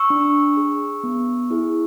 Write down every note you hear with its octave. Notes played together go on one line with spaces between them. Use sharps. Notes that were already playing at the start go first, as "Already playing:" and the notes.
Already playing: C#6 E6
D4
G#4
B3
E4 G#4